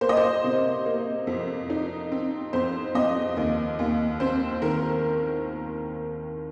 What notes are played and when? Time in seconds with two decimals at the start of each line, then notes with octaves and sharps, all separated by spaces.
0.01 A#3 C5
0.09 D#5
0.17 C5
0.44 C3
0.85 A#3
1.27 F2
1.70 D#4
2.12 C4
2.53 F2 C5
2.95 F2 D#5
3.37 D#2
3.79 D#2
4.20 C4 C5
4.62 D#3 A#4